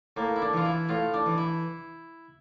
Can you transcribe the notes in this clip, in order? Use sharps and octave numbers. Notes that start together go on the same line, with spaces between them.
A2 A#3
E4
D4
E3 F4
E4
A2 F4
D4
E3
E4